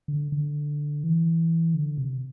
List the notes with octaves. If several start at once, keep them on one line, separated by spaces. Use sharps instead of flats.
D3
D3
E3
D3
C3